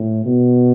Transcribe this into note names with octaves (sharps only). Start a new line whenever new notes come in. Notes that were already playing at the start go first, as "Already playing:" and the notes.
Already playing: A2
B2